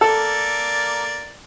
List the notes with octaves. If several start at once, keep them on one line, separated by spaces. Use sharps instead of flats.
A#3 A4 D5